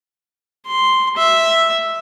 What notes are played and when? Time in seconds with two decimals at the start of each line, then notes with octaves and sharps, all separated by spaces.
0.66 C6
1.17 E5